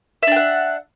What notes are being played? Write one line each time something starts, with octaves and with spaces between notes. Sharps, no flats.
D4 E5 F#5 G5